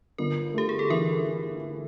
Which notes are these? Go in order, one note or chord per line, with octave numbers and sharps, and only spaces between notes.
G1 A#4
A3 G4
G#4
A4
E3 A#4